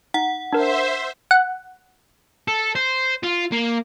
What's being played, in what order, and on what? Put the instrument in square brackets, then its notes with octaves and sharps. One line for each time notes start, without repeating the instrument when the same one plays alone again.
[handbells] D#4 [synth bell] F#5
[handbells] D4 A#4 [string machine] C5 E5
[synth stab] F#5
[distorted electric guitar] A4
C5
F4
A#3